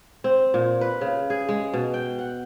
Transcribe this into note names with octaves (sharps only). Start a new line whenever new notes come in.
C4
A#2
B4
C#3
G#4
G#3
B2
G5
F#5